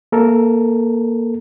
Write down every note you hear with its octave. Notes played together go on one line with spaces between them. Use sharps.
A#3 A4 A#4